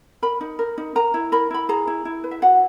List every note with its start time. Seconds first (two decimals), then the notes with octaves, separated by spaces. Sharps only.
0.22 A#4 B5
0.41 D#4
0.59 A#4
0.78 D#4
0.95 A#4 A#5
1.14 E4
1.32 A#4 B5
1.51 E4 B5
1.69 G#4 A#5
1.87 E4
2.05 E4
2.24 B4
2.31 E5
2.42 F#4 F#5